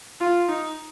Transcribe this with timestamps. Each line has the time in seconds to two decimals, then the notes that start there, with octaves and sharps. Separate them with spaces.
0.20 F4
0.48 D#4